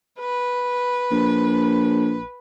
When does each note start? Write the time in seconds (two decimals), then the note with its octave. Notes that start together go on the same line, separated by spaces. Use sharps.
0.20 B4
1.12 A#1